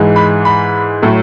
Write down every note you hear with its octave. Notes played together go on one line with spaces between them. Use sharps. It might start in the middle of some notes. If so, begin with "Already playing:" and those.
Already playing: G#2 E3 G#3
B5
B5
A2 F#3 A3